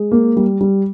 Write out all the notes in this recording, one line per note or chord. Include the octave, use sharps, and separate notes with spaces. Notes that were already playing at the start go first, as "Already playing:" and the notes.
Already playing: G#3
A#3
G3
G3